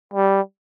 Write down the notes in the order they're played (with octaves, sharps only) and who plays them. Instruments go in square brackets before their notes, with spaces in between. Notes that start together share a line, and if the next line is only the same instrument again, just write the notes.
[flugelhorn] G3